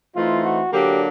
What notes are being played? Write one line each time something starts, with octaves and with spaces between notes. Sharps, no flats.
E3 A3 C4 D#4 F4
F#4
D3 F#3 A#3 D4 G4